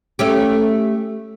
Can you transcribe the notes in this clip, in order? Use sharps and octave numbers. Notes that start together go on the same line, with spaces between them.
A3 C#4 G4